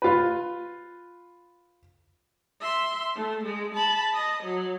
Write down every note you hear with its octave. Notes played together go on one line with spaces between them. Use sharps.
F4 B4
E5 C6
A3
G#3
A5 B5
D#5
F#3